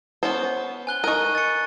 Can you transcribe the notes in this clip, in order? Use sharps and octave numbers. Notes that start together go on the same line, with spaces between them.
B3 C#4 C5
G#5 F#6 G7
D#4 A#4 C#6 F#6 D#7
A6 C#7